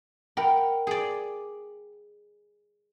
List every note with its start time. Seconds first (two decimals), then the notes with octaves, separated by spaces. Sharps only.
0.37 A#4 F#5 G5 B5
0.87 G#4 D5